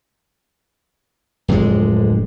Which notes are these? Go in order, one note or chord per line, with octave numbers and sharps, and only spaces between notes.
D1 F2 D3 G#3